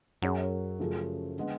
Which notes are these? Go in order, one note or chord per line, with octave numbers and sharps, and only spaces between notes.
F#2 F#3 C#4 G#4 C#5
C#3 F3 A3 F4 G#4
D3 G#3 B3